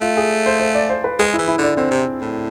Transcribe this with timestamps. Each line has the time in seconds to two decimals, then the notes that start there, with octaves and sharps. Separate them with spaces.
0.01 A3 F4
0.17 G#4
0.46 C5
0.60 C5
0.75 D5
0.90 C5
1.04 B4
1.19 G#3 G#4
1.33 E3 E4
1.48 E4
1.58 D3
1.63 D4
1.77 D3 C4
1.91 C3
2.21 A2